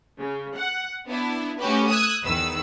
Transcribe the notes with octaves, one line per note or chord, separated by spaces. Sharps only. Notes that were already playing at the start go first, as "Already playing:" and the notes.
C#3
F#5
B3 D4 E4
A3 C#4 F#4 G4 B4
D#6 E6 F#6 G#6
E2 D#3 B4 E6